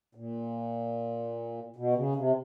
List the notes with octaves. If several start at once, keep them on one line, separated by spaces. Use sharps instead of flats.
A#2
B2
C#3
C3